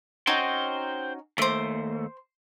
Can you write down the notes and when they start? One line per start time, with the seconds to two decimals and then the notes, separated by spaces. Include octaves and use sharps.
0.27 C#4 D#4 F#4 C5 G5
1.38 D#2 A3 C5 D6